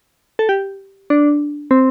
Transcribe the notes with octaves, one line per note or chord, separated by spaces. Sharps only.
A4
G4
D4
C4